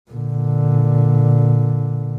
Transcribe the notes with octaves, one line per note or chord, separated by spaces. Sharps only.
A#2 D3